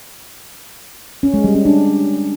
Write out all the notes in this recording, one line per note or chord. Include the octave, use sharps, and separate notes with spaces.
C#4
G#3
G3
C#4
D4